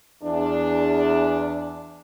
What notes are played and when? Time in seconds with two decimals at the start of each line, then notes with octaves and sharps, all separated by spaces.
0.22 E2 D4